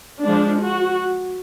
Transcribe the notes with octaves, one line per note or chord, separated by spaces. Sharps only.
F3 G#3 D4
F#4